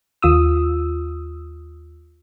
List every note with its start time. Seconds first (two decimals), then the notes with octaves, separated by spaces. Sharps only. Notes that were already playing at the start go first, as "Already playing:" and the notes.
0.22 D#2 F4 D#6 E6